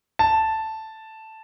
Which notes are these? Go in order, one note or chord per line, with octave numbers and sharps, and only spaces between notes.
A5